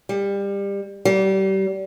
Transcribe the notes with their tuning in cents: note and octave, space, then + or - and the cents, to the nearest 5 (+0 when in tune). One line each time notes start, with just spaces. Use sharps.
G3 +25
G3 -30